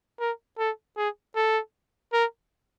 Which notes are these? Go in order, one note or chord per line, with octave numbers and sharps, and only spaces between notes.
A#4
A4
G#4
A4
A#4